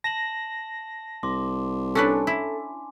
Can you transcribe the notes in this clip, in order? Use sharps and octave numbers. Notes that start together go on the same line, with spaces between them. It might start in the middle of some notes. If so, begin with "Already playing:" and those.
A5 A#6 E7 F#7
C2 C6 D6
C#4 D4 A4 B4 G#5
E4